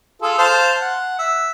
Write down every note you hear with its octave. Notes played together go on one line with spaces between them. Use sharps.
F4 G#4 A4
C5 F5 A5
F#5
E5